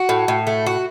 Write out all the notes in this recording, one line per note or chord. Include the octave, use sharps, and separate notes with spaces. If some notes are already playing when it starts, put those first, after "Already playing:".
Already playing: F#4
A2
A2
A3
F#4